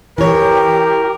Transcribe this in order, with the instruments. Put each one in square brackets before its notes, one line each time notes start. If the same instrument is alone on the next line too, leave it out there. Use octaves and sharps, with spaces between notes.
[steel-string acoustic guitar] E3 C#5 [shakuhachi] G4 [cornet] A#4